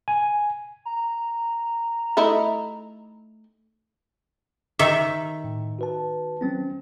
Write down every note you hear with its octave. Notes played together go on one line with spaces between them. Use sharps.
G#5
A#5
A3 D#4 E4
D#3 E5
A2
F#4 B4 A5
F#3 C4 C#4